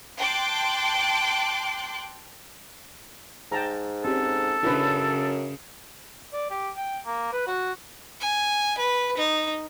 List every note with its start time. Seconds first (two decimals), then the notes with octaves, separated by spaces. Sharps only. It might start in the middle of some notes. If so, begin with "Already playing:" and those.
0.18 G5 A5 C6 D6 F#6
3.52 G#2 G5 A5 A#5
4.05 C4 C#4 G4 A4
4.63 F#2 C#3 D4 E4 B4
6.33 D5
6.50 G4
6.76 G5
7.06 A#3
7.33 B4
7.47 F#4
8.21 G#5
8.78 B4
9.18 D#4